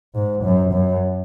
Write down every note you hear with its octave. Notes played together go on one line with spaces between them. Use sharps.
G#2
F#2
F#2